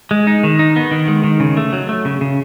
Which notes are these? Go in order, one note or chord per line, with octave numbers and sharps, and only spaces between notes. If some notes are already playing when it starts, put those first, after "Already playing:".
G#3
D#4
D#3
D#4
B3
D#3
G#3
D#3
C#3
A3
F#3
A3
C#3
C#3